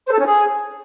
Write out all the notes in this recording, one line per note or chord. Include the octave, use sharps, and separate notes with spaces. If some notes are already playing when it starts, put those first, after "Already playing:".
C5
A4
C#4
G#4